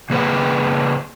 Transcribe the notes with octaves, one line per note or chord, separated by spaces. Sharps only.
C#3 A#3 G#4 B4 C5 F#5